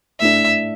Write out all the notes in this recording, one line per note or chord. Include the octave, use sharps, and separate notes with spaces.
A2 A3 D4 E5